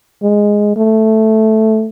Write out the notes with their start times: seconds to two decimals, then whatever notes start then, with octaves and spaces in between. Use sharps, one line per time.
0.22 G#3
0.76 A3